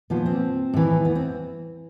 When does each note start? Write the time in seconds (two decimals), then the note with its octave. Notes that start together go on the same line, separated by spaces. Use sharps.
0.10 A#2 F3 B3
0.26 C4
0.74 A2 E3
1.05 B3
1.15 C4